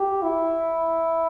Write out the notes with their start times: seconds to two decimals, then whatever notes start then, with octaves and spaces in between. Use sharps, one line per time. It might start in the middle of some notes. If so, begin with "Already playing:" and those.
Already playing: G4
0.22 E4